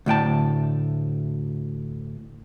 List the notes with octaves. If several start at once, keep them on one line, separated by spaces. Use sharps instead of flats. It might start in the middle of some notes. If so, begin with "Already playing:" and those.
D2 A2 G5 A5